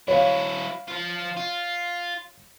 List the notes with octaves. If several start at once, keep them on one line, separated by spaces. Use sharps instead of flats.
F#3 E4 C#5 F5
F3 F4
F4